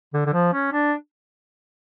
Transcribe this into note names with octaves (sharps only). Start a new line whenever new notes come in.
D3
D3
F3
C#4
D4